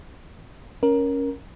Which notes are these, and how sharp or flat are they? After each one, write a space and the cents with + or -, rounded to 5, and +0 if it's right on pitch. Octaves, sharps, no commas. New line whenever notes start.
C#4 +0 A#4 +10